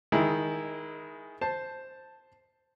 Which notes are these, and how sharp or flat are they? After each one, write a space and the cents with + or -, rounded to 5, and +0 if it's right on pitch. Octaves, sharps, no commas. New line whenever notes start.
D#3 +15 G#3 +0 E4 -5
C5 +0 A5 +0